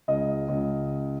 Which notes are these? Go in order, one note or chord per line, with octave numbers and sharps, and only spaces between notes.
C#2 D#5
C#2